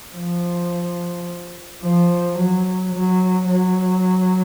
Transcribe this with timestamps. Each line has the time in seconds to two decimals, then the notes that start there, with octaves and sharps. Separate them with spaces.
0.15 F3
1.82 F3
2.38 F#3
2.94 F#3
3.49 F#3